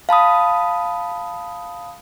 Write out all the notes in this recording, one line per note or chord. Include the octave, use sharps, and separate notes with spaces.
F5 A5 B5 D#6